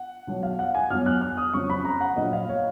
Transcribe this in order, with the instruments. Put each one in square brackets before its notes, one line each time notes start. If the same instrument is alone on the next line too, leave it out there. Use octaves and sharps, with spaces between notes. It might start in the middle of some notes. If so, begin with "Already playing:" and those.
Already playing: [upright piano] F#5
B1 B2 F#3
F5
F#5
G#5
B1 B2 F#3 F6
F#6
F6
D#6
F2 C#3 F#3 C#6
B5
A#5
F#5
A#1 A#2 F#3 D#5
F5
C#5